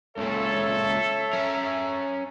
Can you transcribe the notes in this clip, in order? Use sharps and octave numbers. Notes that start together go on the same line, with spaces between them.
C#2 A#2 A4 C#5 E5
C#4 A#4